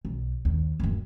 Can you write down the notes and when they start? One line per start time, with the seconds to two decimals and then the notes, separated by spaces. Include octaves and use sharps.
0.05 B1
0.45 D#2
0.80 D1 F#2